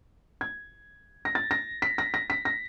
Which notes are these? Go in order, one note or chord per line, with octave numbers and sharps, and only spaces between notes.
G#6
A#6
A6
A#6
B6
A#6
A#6
B6
A#6